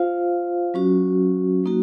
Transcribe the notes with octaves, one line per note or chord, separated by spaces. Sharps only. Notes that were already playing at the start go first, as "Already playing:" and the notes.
Already playing: F4 C5 F5
F#3 C#4 F#4
F#3 A#3 D#4 F#4